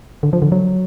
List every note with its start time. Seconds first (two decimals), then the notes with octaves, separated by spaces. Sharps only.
0.23 D3
0.33 F3
0.42 D3
0.52 F#3